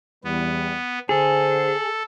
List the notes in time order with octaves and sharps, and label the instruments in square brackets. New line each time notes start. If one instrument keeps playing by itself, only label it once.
[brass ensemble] E2 G3 [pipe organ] B3
[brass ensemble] D3 C5 F#5 [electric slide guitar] G#4 [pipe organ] A4